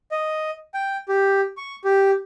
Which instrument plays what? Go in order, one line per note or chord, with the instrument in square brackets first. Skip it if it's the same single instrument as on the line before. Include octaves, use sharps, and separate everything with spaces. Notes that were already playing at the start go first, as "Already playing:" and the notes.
[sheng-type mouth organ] D#5
G5
G4
C#6
G4